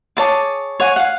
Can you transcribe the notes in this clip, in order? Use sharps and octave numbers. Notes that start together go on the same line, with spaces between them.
G#4 C#5 A5 D6
C#5 F#5 G#5
F5 F#5